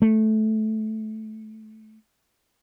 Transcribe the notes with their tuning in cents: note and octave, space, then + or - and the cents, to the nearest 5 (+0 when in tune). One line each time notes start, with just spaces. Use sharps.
A3 -15